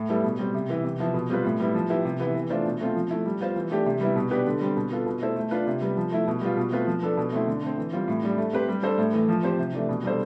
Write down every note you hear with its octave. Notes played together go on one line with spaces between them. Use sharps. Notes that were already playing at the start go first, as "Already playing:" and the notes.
Already playing: A2
G3 B3 E4 A4
B2
G3 C4
C3
E3 B3 E4
C3
F3 B3 E4
B2
G3 C4 F4 B4
A2
G3 B3 E4
F3
B3 E4 G4
C3
E3 B3 E4
E3
A3 D4 F4 C5
B2
A3 C4 F4
F3
A3 E4
G3
B3 F4 C5
E3
A3 D4 G4
C3
G3 B3 E4
B2
B3 D4 G4 B4
D3
G3 C4
B2
B3 F4 A4
B2
A3 E4 A4 C5
A3
D4 F4 B4
C3
G3 B3
F3
A3 E4
B2
G3 B3 F4
B2
A3 C4 F4 B4
F3
B3 D4 A4
B2
A3 C4 E4
D3
A3 C4
E3
G3 C4 F4
A2
G3 D4
A3
C4 G4 B4
G3
D4 A4 C5
A2
E3 A3
F3
C4 G4 C5
C3
E3 A3 D4
B2
G3 D4 A4 C5